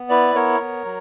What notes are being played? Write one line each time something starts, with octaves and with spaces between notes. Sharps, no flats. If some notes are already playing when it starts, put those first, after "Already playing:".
Already playing: B3
E4 B4 D5
B3 A#4 C#5
B3
F#3